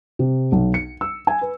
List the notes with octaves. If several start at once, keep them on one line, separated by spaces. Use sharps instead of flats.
C3
B1
C#7
E6
G#5
B4